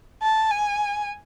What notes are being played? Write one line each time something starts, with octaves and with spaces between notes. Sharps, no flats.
A5
G#5